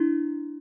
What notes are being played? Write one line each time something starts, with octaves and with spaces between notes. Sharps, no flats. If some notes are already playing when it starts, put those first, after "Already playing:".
Already playing: D4 E4